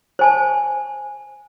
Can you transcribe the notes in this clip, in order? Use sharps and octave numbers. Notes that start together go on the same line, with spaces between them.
C5 G#5 A5